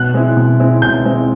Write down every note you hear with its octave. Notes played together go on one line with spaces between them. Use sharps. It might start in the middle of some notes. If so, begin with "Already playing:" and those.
Already playing: B2 F#6
G#3 C4 E4
B2
G#3 C4 E4
B2 G6
G#3 C4 E4